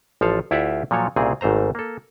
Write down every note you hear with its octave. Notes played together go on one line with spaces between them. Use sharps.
A1 F3 A4 F5
D2 E4 F4 G4 E5 F#5
A#2 F3 F#3 A4 C#5
C2 A#2 C#3 C4 G#4
G#1 G#2 A3 C5 A#5
A#3 A4